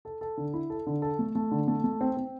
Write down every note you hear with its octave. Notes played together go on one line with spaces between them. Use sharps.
A4
A4
D3
E4
A4
D3
A4
A3
A3
D3
A3
A3
C4
C4